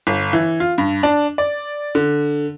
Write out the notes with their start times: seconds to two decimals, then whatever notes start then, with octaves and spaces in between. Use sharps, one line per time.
0.07 G1
0.33 E3
0.60 F4
0.78 G2
1.03 D4
1.38 D5
1.95 D3